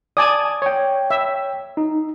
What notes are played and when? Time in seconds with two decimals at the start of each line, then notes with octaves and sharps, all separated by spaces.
0.17 D5 G#5 A5 D#6
0.62 C#5 G5
1.11 E5
1.77 D#4